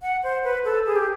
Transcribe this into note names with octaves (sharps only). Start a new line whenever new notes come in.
F#5
C5
B4
A4
G#4
G4